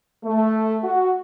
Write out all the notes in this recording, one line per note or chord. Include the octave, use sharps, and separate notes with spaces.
A3
F#4